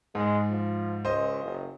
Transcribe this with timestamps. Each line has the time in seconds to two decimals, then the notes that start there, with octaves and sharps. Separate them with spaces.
0.15 G#2 G#3
0.50 F3
1.05 C#2 C5 D#5
1.43 F#1